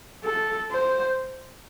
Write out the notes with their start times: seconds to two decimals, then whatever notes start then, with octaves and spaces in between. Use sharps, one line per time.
0.24 A4
0.71 C5